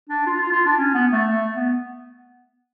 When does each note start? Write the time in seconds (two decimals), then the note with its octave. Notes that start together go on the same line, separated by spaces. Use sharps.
0.09 D4
0.26 F4
0.39 F4
0.52 F4
0.66 D4
0.78 C#4
0.94 B3
1.12 A3
1.29 A3
1.55 B3